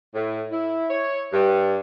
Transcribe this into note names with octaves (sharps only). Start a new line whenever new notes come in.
A2
E4
C#5
G2